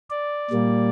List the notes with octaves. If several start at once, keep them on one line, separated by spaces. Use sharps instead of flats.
D5
A#2 G3 A#3